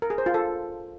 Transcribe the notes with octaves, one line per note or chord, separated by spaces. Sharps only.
A#4
G#4
C5
F4
A4